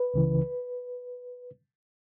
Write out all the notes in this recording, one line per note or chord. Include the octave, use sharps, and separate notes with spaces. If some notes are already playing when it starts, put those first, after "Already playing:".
Already playing: B4
C#2 C#3 E3